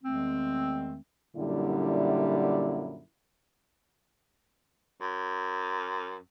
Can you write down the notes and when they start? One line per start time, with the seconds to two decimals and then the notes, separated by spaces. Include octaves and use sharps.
0.04 E2 D#3 G#3 A3 C4
1.36 F#2 A#2 D3 G3 E4
5.01 F#2